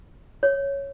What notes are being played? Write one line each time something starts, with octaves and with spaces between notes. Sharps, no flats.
C#5